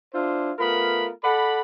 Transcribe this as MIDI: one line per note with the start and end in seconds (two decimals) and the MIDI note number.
0.13 0.51 62
0.13 0.51 64
0.13 0.51 65
0.13 0.51 72
0.58 1.08 57
0.58 1.08 59
0.58 1.08 65
0.58 1.08 70
0.58 1.08 83
1.23 1.61 69
1.23 1.61 74
1.23 1.61 78
1.23 1.61 83